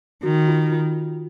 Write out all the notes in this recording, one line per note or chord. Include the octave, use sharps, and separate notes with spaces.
D#3 F#4
F4
F4